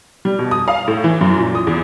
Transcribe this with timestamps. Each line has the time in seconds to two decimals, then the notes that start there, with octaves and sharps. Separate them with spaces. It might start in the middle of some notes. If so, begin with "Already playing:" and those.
0.25 G3
0.39 B2
0.51 D#6
0.68 F5
0.88 A2
1.04 E3
1.21 F#2
1.38 A#2
1.55 D#6
1.67 E2